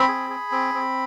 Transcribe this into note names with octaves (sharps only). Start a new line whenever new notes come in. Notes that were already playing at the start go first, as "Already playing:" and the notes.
Already playing: C4 B5
G#4
G#4
C4
C4